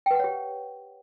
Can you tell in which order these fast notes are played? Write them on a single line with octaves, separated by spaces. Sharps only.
G5 B4 F#5 C#5 G4